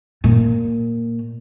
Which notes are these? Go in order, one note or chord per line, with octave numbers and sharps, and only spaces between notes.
A#2